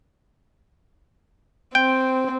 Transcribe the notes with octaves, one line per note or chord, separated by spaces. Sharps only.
C4 G5